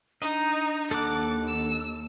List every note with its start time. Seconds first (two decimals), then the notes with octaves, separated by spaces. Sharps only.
0.22 D4 D#4 D#5
0.91 D#2 A4 F#5 D6
1.48 E6